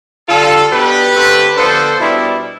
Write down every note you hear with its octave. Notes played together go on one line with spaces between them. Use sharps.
D3 G3 D4 F4 A4
B2 B3 D4 G4 B4
D3 A3 C4
D3 F3 B3 D4 A4 C5
B2 G3 D4 E4